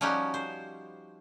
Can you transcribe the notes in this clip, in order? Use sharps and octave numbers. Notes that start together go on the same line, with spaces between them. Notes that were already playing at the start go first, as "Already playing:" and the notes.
F3 G3 C#4 D#4 F#4 G4
C5